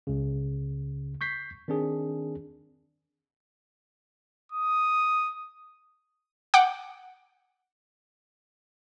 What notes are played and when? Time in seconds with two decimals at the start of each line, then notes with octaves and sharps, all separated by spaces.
0.07 C#2 C#3
1.21 C#6 G6 B6 C7
1.68 D#3 C4 D4 G#4
4.52 D#6
6.54 F#5 G5 D6